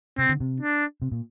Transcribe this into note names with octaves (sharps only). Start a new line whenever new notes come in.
C3 C4
D3
C3
D4
C3
A#2